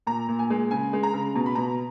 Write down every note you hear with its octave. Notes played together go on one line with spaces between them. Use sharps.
A#2 A#5
A#2
G#5
G#3
C#3 G#5
G#3
A#5
C#3
B2 A#5
B5
B2 A#5